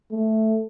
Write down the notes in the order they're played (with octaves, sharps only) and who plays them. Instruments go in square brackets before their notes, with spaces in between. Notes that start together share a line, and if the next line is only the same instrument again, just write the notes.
[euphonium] A3